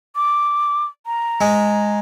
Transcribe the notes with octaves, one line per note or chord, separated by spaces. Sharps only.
D6
A#5
G#3